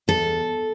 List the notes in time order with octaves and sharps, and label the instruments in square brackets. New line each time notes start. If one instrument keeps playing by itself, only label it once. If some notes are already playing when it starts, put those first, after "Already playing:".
[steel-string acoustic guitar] E2 A4